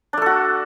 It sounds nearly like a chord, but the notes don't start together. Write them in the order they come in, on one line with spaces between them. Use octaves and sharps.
D4 A3 A4 F#4